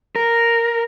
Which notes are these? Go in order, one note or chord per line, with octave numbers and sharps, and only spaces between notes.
A#4